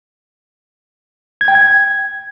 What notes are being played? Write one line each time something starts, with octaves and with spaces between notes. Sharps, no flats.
G#6
G5
G#6